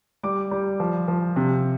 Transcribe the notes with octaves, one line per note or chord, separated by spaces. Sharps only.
G3 D6
G3
F3
F3
C3